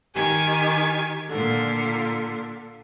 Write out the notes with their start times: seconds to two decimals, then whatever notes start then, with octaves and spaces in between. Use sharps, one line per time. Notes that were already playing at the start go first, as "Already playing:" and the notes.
0.15 D#3 G4 G#5 G#6
1.29 A#2 D3